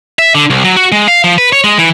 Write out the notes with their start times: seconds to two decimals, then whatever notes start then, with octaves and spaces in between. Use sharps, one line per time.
0.19 E5
0.35 D3
0.50 C2
0.65 F#3
0.77 F#4
0.92 G#3
1.08 F5
1.24 F3
1.38 B4
1.53 C#5
1.64 G#3
1.79 E3